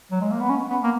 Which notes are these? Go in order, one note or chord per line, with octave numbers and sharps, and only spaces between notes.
F#3
G#3
A#3
B3
C#4
B3
A#3